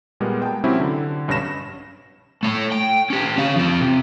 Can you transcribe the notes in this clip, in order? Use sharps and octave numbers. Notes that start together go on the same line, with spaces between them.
A#2 G3 G#3 A#3 B3
G5 A5
C3 F#3 C4 C#4 E4 G4
D3
B1 G2 C#4 B5 A#6 E7
A3 C#5
G5
C#4 G4
C#4 F5
F3 C4
C3